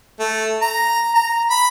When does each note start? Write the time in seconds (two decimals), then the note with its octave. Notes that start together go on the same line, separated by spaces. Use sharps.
0.20 A3
0.62 A#5
1.15 A#5
1.50 B5